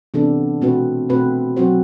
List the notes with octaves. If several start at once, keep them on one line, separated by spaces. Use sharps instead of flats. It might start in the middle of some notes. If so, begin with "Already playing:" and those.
C3 E3 B3 D4 A4
B2 A3 C4 F#4 B4
B2 A3 C4 F#4 B4
F#3 C4 F#4 C5